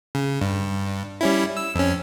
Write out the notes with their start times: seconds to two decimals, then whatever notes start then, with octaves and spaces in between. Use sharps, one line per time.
0.15 C#3
0.41 G2
1.21 G3 C#4 E4
1.57 E6
1.75 F2 C#4